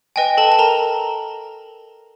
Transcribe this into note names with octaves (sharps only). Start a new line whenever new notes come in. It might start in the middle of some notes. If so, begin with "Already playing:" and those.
B4 D#5 G5 G#5
A4 A5
A5
A#4 A#5